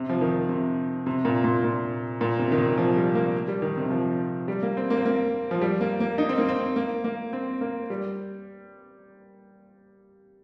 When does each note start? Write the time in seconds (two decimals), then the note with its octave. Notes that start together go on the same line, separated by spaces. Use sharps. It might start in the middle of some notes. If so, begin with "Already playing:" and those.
Already playing: C3
0.09 F3
0.21 D#3
0.49 C3
1.06 C3
1.25 A#2
1.44 A#2
1.64 A#2
2.21 A#2
2.39 C3
2.52 D#3
2.58 C3
2.78 F3
2.96 G3
3.15 A#3
3.48 G3
3.62 D#3
3.77 C3
3.90 F3
4.48 G3
4.63 A#3
4.77 C4
4.90 A#3
4.97 C4
5.06 A#3
5.51 F3
5.61 G3
5.81 A#3
6.00 A#3
6.18 D#4
6.29 C4
6.38 A#3
6.49 C4
6.76 A#3
7.04 A#3
7.33 C4
7.61 A#3
7.90 G3